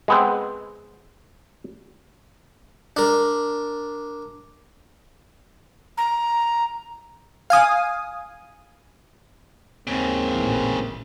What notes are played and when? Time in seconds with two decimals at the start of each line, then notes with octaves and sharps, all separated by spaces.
0.08 G#3 B3 C4
2.97 D4 A#4
5.98 A#5
7.50 F5 G#5 D#6
9.87 D#2 G#2 C#3 A#3 C4
10.33 A1 A#2 E3